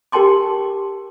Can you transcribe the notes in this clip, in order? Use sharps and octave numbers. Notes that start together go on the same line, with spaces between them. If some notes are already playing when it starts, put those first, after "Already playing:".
G4 A#4 G5 A5 C6 D6